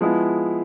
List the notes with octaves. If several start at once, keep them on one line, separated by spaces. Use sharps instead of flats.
F3 G#3 B3 E4